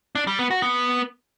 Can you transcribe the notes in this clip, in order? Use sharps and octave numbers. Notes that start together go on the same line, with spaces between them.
D4
G3
B3
F#4
B3